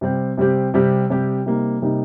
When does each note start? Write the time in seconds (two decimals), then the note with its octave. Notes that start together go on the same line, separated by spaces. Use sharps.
0.01 C3 G3 C4 G4
0.37 C3 G3 C4 G4
0.74 C3 G3 C4 G4
1.10 C3 G3 C4 G4
1.46 C3 G3 A#3 D#4
1.82 C3 G3 A#3 D#4